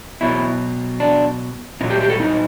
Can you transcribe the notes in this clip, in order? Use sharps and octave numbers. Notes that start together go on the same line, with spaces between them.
B2 F#3 E4
D4
A#2 F#3 D#4
G4
G4
A4
D#4